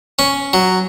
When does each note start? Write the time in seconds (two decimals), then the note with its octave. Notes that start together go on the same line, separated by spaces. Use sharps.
0.19 C#4
0.53 F#3